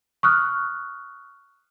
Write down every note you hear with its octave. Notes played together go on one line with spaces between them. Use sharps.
C#6 D#6 F6 F#6